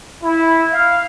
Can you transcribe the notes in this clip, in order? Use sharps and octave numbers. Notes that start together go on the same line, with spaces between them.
E4
F5